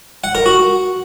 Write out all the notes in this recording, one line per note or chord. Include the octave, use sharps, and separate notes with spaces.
F#5
A#4
F#4